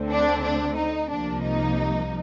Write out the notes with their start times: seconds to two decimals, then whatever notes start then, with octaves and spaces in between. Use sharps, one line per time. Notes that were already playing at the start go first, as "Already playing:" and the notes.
Already playing: D2 D3 A3 C4
0.10 D4
0.43 D4
0.76 D#4
1.10 C2 C3 F3 A#3 D4
1.43 D#4